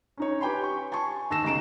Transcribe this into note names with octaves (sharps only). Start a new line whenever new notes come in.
C#4 D#4 C#5
G4 B4 G5 G#5 B5 C6
C#6
G#5 A5 C6 C#6
D#2 A5 E6 A#6 E7
B1 C#3 A#5 D7 E7